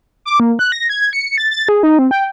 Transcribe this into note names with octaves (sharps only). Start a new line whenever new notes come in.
D6
A#3
F#6
A#6
G#6
C#7
A6
A6
G#4
D#4
C4
G5